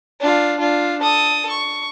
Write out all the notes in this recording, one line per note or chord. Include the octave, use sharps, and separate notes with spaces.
D4 F4
D4 F4
A4 D#6
C#6